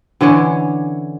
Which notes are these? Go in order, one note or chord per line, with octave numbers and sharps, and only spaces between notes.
D3 E3 C#4 C#5